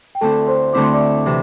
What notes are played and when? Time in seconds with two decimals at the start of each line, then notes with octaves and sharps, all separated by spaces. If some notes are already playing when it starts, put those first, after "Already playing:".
0.15 G5
0.21 D2 D3 C4 E4 A4 A5
0.47 C5 C6
0.73 D2 D3 C4 E4 D6
0.84 C6
0.94 D5 D6
1.26 C3 E3